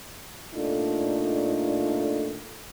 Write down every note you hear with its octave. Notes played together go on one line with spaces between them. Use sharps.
A#2 A3 D4 D#4 F4 A4